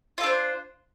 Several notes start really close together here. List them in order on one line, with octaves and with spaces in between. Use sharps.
F4 A4 D4 C5